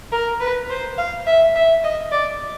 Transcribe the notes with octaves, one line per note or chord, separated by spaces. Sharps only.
A#4
B4
C5
F5
E5
E5
D#5
D5